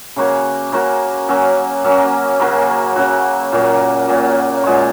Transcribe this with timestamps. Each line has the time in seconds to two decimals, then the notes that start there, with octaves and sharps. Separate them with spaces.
0.16 C#3 A#3 F#4 C#5
0.72 C#3 A#3 F#4 C#5
1.29 F#3 A#3 C#4
1.84 F#3 A#3 C#4
2.40 C#3 F#3 A#3 F#4
2.96 C#3 F#3 A#3 F#4
3.52 A#2 F#3 A#3
4.08 A#2 F#3 A#3
4.64 A#2 G#3 F#4 C#5